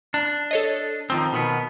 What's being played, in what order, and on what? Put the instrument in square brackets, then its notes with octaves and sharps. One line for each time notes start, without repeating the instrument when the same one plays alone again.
[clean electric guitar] D4
[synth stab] A4 C#5 D#5
[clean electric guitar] D#3 F3 C4
B2 D#3 B3